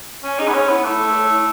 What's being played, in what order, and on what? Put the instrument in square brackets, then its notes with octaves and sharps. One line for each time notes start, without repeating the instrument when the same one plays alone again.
[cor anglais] C#4 [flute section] G#5
[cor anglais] D#4 [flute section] G#4
[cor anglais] B3
[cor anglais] C#4 [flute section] C#5
[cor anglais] B3 [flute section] E4
[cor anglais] A3 [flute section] E4
[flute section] A4
C#5
E4